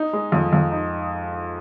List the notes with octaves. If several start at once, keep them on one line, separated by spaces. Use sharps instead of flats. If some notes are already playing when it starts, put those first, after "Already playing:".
Already playing: D#4
G#3
F2
F2
D#4